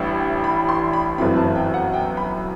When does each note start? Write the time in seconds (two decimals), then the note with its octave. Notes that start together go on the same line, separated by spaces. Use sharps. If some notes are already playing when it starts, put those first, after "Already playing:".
Already playing: A1 A2 G3 D4
0.44 B5
0.69 C6
0.93 B5
1.18 G1 F#2 E3 A3 C4 B5
1.36 A5
1.55 G5
1.74 F#5
1.93 G5
2.17 B5